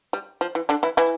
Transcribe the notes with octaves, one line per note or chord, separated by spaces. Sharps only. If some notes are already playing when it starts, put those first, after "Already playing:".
G3
F3
E3
D3 D4
E3 E4
E3 E4